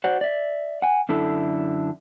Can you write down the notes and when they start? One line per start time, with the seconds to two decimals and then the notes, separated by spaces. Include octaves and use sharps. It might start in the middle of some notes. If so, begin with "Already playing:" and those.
0.04 F#4 C5 D5 F#5
0.21 D5 E5
0.82 F#5 G#5
1.09 F#2 D3 E4 A4